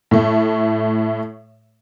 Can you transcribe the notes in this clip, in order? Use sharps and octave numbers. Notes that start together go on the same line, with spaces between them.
A2 A3